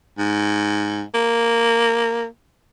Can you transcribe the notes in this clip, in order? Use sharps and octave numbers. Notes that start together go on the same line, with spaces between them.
G#2
A#3